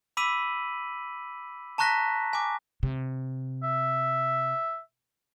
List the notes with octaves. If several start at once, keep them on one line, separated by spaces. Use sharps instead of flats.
B5 D6 E6 B6 D#7 F#7
A5 A#5 C#6 F#6 A#6 B6
G#5 D6
C3
E5